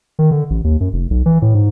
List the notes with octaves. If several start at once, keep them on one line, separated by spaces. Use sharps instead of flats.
D#3
D3
A1
D#2
F#2
F1
B1
E3
A2
G#2